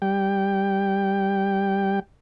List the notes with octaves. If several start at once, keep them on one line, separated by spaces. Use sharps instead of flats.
G3 G5